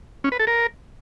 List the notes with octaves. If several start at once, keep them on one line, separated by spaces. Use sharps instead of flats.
C#4
B4
A4
A#4